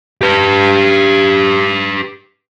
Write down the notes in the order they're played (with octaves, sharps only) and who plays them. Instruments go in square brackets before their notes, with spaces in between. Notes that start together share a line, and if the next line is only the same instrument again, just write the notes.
[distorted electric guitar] G4 B4